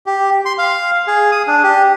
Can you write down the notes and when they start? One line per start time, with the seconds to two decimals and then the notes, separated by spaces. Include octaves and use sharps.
0.06 G4
0.45 C6
0.58 F5
1.07 G#4
1.32 D#6
1.47 D4
1.64 G4